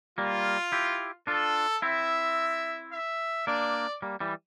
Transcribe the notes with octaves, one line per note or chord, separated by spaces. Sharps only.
G3 A#3 F4
E4 G4
D4 F4 A4
C4 E4 E5
E5
A#3 D4 D5
G3 A#3
E3 G3